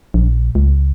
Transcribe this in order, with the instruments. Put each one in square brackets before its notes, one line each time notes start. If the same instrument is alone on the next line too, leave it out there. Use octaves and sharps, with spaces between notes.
[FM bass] A#1
C#2